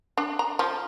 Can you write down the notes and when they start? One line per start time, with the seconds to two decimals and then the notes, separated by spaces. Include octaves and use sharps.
0.17 D4
0.39 A#5
0.59 F3